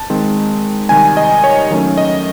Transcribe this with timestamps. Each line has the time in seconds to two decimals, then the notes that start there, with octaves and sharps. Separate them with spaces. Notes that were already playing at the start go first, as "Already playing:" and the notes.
Already playing: A5
0.10 D#3 G#3 C4
0.89 C3 D#3 G3 G#5
1.17 D#5
1.44 C#5
1.71 D#3 F#3 A3 C#4
1.98 D#5